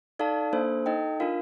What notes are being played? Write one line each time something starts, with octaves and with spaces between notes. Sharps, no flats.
D#4 A4 D5 F5 A5
A#3 D4 A4 C5
D#4 A4 D#5 G5
D4 F4 A#4 F5